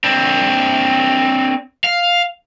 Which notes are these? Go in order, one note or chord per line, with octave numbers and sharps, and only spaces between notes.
C4 D4
F5